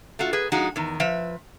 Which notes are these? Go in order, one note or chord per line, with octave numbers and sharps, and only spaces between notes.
A3 F4 F#4
G#4 B4
F3 G#3 D#4 F#4
E2 D#3
F3 B4 E5